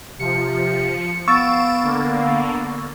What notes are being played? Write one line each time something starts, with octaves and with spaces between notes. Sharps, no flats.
C3 F3 C#7
B3 F5 C#6 E6 A6 D7 E7
D3 A#3